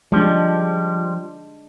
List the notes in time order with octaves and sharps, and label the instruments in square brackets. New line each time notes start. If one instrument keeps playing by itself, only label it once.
[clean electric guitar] F3 G3 [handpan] G#3 D4